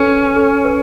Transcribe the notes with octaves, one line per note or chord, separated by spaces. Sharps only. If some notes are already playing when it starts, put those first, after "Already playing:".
Already playing: C#4 A4 B4
A4
B4